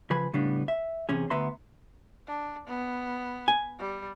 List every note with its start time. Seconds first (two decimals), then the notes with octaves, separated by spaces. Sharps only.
0.10 C#3 F3 B4 G#5 B5
0.34 A2 C#3 G3 B3 D4
0.68 E5
1.09 E2 C3 C#4 G#4
1.30 D2 B3 B4 E5 A#5 C6
2.27 D4
2.67 B3
3.48 G#5
3.79 G3